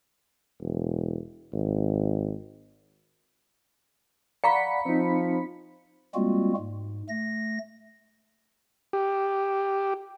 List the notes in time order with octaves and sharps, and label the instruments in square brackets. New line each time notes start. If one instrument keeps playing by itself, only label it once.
[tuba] E1
G#1
[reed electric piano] D5 F#5 [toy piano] F5 A#5 C#6 [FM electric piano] B5 B6 C#7
[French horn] F3 [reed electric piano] C4 D#4
[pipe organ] G3 G#3 A#3 C4 F4 F#4
G#2
A3 A#6
[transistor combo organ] G4